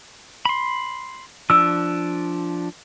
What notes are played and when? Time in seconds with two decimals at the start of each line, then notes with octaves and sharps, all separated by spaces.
0.45 B5 C6
1.50 F3 D4 E6